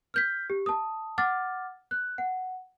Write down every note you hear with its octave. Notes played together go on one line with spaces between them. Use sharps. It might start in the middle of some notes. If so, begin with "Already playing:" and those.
F6 G6 B6
G4
A5 D#6
F#5 D6 F6 A6
F#6
F#5